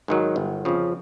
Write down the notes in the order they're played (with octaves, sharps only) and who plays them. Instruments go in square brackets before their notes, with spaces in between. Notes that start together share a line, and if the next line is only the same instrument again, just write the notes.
[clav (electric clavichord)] G#2 D#3 F#3
G1
F2 C#3 F3